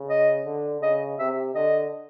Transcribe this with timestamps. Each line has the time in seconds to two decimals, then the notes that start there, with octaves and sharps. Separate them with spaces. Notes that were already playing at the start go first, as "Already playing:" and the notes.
Already playing: C#3
0.09 D#5
0.45 D3
0.81 C#3 D#5
1.18 C3 E5
1.55 D3 D#5